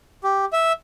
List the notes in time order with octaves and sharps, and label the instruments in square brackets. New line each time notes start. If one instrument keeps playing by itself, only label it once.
[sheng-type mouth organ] G4
E5